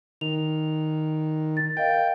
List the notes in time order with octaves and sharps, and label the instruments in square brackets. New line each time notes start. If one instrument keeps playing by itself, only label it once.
[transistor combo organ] D#3 [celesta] F7
[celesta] A6
[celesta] A#4 D#5 F5 [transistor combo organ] G5